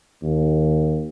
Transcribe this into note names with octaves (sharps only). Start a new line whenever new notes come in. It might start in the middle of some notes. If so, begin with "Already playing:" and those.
D#2